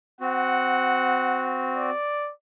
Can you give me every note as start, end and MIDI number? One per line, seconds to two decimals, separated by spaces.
0.21 1.90 60
0.21 1.90 66
0.21 1.50 78
1.76 2.31 74